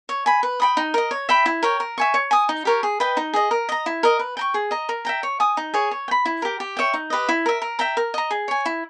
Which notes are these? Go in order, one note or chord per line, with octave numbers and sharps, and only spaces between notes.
C#5
G#5 B5
B4
G5 B5 D#6
D#4
A#4 D#5
C#5
E5 G5 B5
E4
A#4 C#5 G5
A#4
E5 G#5 C#6
C#5
G#5 D#6
D#4
G4 A#4 C#5
G#4
B4 D#5 G5
D#4
G#4 D#5
A#4
D#5 A#5
E4
A#4 D#5
B4
G5 A#5 C#6
G#4
D#5 A#5
A#4
E5 G5 A#5
C#5
G#5 D#6
D#4
G#4 C#5
C#5
G5
B5
E4
G4 A#4
G4
C#5 E5 G5
D#4
G4 B4 D#5
E4
A#4 E5
A#4
E5 G5 A#5
A#4
D#5 A#5
G#4
C#5 G#5
E4